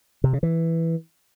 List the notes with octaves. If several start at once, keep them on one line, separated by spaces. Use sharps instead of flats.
C3
C#3
E3